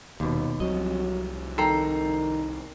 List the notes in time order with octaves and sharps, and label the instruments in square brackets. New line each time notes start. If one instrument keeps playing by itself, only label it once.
[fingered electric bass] D#1 [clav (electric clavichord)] D#2 B2
[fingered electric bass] C2 C3 F3 [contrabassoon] F#3 [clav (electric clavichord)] D#5
[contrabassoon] D#3 [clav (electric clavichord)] A4 [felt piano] G5 A#5 C7